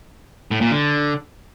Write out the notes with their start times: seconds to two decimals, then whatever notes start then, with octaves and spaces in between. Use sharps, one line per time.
0.51 A2
0.61 A#2
0.71 D3